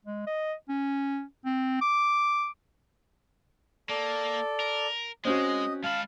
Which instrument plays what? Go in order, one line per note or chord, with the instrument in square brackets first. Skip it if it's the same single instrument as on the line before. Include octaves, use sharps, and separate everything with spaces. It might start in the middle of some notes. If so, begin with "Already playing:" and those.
[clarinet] G#3
D#5
C#4
C4
D6
[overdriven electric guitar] A#3 [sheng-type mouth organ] A4 D5
[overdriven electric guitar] A#4
[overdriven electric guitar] G#3 [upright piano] C4 C#4 F#4 [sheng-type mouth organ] D#5
[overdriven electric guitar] G#3 B5 [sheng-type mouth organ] F5 A5